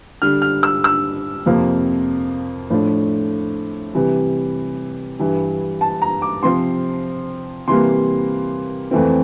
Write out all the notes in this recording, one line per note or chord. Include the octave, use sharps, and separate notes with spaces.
D3 G3 D4 F6
F6
E6
E6
F2 C3 F3 A#3
A2 F3 A3 D4
C3 E3 G3
G2 E3 G3
A5
A#5
D6
C3 F3 C4 C6
C3 E3 G3 A#3 C6
F2 E3 A3 C4